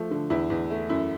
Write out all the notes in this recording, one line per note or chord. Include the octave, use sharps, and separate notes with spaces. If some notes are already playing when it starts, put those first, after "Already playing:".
Already playing: F3 A3
D3
E2 E4
E2
A3
F#2 E4